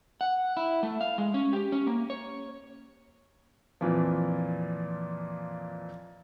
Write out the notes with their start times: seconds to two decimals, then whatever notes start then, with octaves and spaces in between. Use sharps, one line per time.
0.21 F#5
0.57 E4
0.83 A3
1.01 F5
1.18 G#3
1.34 C#4
1.53 G4
1.72 C#4
1.87 A#3
2.10 C#5
3.81 F2 A#2 E3 F3